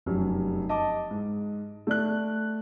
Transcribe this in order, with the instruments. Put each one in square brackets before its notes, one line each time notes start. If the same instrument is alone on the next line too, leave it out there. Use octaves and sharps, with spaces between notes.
[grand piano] F1 F#2 G3
D#5 A5 D6
G#2
A3 D5 F#6